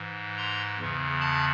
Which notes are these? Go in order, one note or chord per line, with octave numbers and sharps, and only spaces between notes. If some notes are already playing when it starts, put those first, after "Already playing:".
Already playing: G#2 E3
A#5 C6
E2 C#3 E3
A5 B5